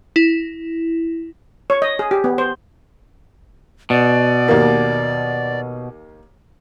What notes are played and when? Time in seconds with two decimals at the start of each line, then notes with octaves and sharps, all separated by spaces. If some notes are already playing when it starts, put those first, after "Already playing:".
0.16 E4
1.70 C#5
1.82 D#5
1.99 G#4
2.11 G4
2.24 B3
2.38 C5
3.90 B2 D5
4.48 D#2 A#3